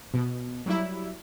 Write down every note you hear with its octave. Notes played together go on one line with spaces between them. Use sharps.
B2
F#3 G3 E4